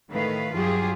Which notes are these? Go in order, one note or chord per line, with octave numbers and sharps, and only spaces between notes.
A2 D#3 A3 B4 F5
G2 F#3 F4 G4 G#4